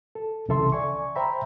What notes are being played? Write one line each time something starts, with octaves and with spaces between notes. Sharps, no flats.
A4
C2 C#3 E3 A4 E5 C6
D5 G#5 C#6
C5 E5 G5 A#5 B5